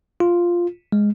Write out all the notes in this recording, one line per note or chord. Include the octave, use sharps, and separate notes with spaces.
F4
G#3